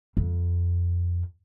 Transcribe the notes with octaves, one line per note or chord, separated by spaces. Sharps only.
F2